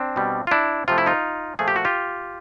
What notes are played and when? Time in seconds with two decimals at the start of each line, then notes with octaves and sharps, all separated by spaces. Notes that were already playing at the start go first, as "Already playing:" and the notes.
Already playing: C4 D4
0.16 B2 G3
0.47 F4
0.51 D4 E4
0.88 C3 F3 A3 F4
0.98 E4
1.06 D#4 F4
1.59 A#2 F3 A3 G#4
1.68 G4
1.76 F#4
1.85 F4 G4